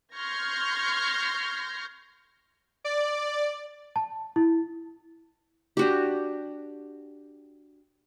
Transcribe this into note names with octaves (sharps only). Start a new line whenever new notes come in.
C6 C#6 F6 G6 G#6 A#6
D5
A5
E4
D4 F#4 G4